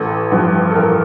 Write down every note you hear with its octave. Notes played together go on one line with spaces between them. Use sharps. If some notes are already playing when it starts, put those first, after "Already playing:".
Already playing: A1 A4
G2 F3
A4
A1 A#4